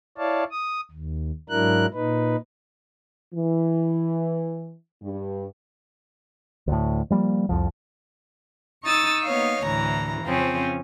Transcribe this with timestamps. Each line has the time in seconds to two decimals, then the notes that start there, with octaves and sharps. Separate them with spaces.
0.18 E4 C#5 D5 F5 A5
0.51 D#6
0.91 D#2
1.50 G#2 F#3 D4 E4 A#4 F#6
1.94 A#2 D#4 B4
3.33 E3
5.02 G2
6.68 D2 A2
7.10 F3 G3 A#3
7.49 C2 F2 F3
8.84 D#4 C#6 D#6 E6 A6
9.25 A#3 B3 D#4 C#5 F5
9.65 D2 A2 E3 A#5
10.23 F2 C#3 F3 C4 C#4